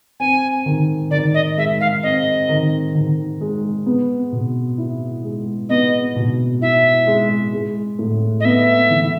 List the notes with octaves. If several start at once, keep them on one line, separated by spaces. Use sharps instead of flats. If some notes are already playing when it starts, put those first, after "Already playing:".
C4 G#5
D#3
D#3 D5
D#5
G#3 E5
F5
C4 D#5
D#3
D#3
G#3
B3
B2
E4
G#3
B3 D#5
B2
E4 E5
G#3
G#3
A2
D#5
B3 E5
E3